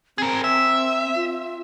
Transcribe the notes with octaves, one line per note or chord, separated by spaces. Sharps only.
C4 G#4 A#4
E5
F4